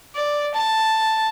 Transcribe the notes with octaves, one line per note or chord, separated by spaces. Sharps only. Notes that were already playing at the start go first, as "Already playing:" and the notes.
D5
A5